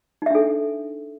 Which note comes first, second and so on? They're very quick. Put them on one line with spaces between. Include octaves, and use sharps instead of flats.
D#4 E5 D4 A4